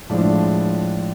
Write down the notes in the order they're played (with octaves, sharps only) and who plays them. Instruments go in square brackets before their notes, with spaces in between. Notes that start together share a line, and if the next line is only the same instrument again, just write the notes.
[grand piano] A2 F3 G#3 D4